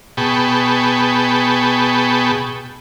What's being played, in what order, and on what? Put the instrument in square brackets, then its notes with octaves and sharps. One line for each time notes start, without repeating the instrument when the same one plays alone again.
[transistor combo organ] B2 G#4 G5 A5 B5 C#6